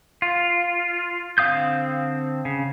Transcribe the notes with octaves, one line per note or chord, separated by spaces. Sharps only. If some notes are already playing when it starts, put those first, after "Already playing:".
F4
D3 C4 F5 D#6 G6
C#3